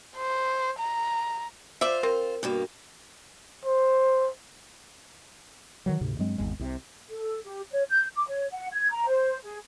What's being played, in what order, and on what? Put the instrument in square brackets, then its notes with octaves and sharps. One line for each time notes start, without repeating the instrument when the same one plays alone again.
[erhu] C5
A#5
[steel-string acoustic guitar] F4 C5 [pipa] D5 E5
[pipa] C4 [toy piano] A#4
[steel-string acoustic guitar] G2 B2 A#3
[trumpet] C5
[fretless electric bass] D#3 E3 F#3
D2 G#2 C3
G2 F#3 G#3 C4
G#1 E2 G#3
C2 C3
[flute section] A4
G4
C#5
G6
D6
C#5
F#5
G#6
A#5
C5
G#4